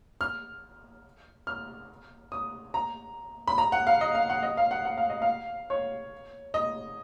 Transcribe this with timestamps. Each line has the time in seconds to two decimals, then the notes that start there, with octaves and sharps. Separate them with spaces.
0.21 F6
1.47 F6
2.32 D#6
2.74 A#5
3.48 B5
3.58 A#5
3.72 F#5
3.87 F5
4.01 D#5
4.15 F5
4.30 F#5
4.43 D#5
4.57 F5
4.71 F#5
4.85 F#5
4.98 F5
5.10 D#5
5.22 F5
5.70 C#5
6.54 D#5